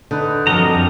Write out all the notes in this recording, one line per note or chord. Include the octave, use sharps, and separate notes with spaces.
D3 D#4 B4
F2 F#3 G3 A4 A#4 D#5 A#5